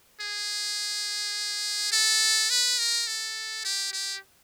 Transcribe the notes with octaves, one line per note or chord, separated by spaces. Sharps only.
G#4
A4
B4
A#4
A4
G4
G4